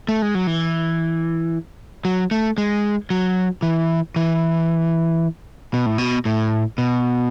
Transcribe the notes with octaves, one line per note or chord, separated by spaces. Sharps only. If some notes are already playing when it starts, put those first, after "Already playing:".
A3
G#3
F#3
E3
F#3
A3
G#3
F#3
E3
E3
B2
A2
B2
A2
B2